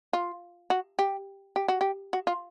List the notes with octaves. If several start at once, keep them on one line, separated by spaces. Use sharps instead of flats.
F4
F#4
G4
G4
F#4
G4
F#4
F4